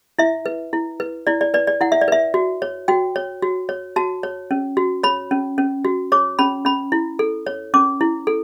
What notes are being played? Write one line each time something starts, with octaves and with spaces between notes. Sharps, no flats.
E4 E5
B4
E4
B4
E4 D5
D5
B4 D5
D5
E4 F#5
E5
D5
B4 E5
F#4
C#5
F#4 G5
C#5
F#4
C#5
F#4 A5
C#5
C#4
F#4
C#5 B5
C#4
C#4
F#4
C#5 D6
C#4 B5
C#4 B5
E4
A4
C#5
C#4 D6
E4
A4